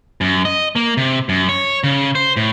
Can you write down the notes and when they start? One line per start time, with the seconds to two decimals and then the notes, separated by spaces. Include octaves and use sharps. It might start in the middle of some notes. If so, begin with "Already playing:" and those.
0.21 F#2
0.45 D#5
0.76 A#3
0.97 C3
1.29 F#2
1.49 C#5
1.84 C#3
2.15 C5
2.36 A2